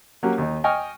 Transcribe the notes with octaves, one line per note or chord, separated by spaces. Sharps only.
F#3 A#3 C#4 G4
D#2 D#4
D#5 G5 G#5 C#6 F6